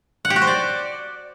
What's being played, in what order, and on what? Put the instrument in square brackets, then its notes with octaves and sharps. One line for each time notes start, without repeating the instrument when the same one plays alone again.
[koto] F#5
G4
F#4
C5
D5